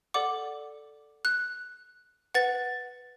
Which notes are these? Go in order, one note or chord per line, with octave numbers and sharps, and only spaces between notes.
A4 D5 F#5 D6
F#6
B4 F#5 A6